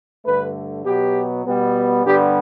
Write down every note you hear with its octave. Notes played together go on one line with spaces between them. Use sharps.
G2 D3 A3 B4
B2 F#3 B3 G4
B2 G3 B3
G2 D3 G3 B3 G4